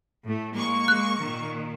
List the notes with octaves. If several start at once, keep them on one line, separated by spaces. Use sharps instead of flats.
A2 A3
G#3 A#3 C#6
G#3 F#6
A#2 D#3